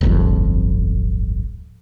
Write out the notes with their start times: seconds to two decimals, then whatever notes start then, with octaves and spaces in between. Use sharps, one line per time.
0.01 D1 G1 F2